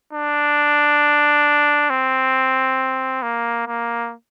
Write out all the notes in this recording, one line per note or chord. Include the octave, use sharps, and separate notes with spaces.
D4
C4
A#3
A#3